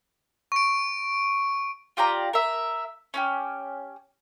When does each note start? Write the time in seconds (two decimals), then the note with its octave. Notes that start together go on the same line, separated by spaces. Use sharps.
0.52 C#6 D7
1.97 F4 G4 D5 A#5
2.33 A#4 E5
3.14 C#4 D#4 G4